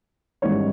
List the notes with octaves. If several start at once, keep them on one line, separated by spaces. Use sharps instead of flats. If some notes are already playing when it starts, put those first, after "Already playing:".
A1 G#2 D#3 G3 C#5